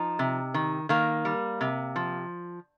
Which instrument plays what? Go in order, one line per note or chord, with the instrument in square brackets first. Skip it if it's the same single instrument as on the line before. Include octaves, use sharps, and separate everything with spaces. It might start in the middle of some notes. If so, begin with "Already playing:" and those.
Already playing: [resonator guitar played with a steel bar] F3 D#4
C3
D#3
D#3 A#3
G3
C3
F3